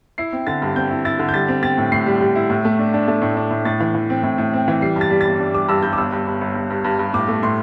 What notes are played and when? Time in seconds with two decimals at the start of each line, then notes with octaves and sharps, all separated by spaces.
0.18 E4 C7
0.33 C4
0.47 D3 A6
0.62 G2
0.76 C4 G6
0.91 E4
1.05 E4 A6
1.19 D3
1.29 G6
1.34 G3 A6
1.48 C4
1.63 C4 A6
1.78 A2
1.92 A2 C7
2.06 G3
2.21 G3
2.35 E4
2.50 A2
2.65 A3
2.79 D4
2.94 D4
3.08 A3
3.22 A2
3.37 D4
3.51 A2
3.65 A2 A6
3.80 E3
3.95 E3
4.10 C4
4.23 A2
4.38 A2
4.53 C4
4.68 E3
4.81 G3 C7
4.96 G2
5.01 A6
5.10 G3
5.21 G1 A6
5.40 D4
5.54 G3 D6
5.68 G2 E6
5.83 G2 G6
5.93 D6
5.98 G1 E6
6.12 G2
6.27 G1
6.41 G1
6.55 G2
6.70 G2
6.84 G2
6.99 G2
7.14 A2 D6
7.28 A3
7.43 A2 C6